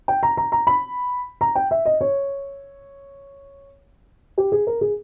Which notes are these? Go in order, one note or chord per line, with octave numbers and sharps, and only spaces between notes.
G5
A#5
A#5
A#5
B5
A#5
G5
E5
D#5
C#5
G4
G#4
A#4
G#4